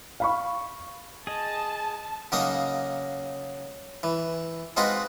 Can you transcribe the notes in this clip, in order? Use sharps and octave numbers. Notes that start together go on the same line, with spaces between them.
F5 B5 C#6
G#4 D#5 A5
C#3 F#3 A#3 D#4 D#5
E3
G#3 C4 D#4 F4 F#4 B4